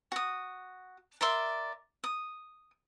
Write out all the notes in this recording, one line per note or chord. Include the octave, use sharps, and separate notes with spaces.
F#4 D#6
A#4 D5 E5 C6
D#6